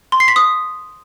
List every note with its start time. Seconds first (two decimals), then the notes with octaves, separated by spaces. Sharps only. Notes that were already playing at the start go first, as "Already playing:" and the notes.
0.12 C6
0.20 C7
0.28 B6
0.36 D#6